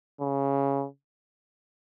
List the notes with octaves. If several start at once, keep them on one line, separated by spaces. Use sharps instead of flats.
C#3